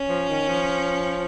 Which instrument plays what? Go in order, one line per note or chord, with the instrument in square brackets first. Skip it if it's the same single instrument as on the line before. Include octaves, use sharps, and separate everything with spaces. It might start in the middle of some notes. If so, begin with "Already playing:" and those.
Already playing: [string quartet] C#4
[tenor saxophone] F3
D#3
F3